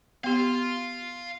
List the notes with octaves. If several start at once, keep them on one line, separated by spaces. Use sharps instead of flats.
B3 G4 F5 C6